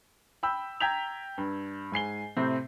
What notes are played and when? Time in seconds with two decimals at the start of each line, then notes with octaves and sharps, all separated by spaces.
0.43 G5 B5 E6 G6
0.80 G5 A#5 G6 G#6 B6 F7
1.38 G2
1.92 G#2 G#5 C7 G7
2.37 A2 C3 C4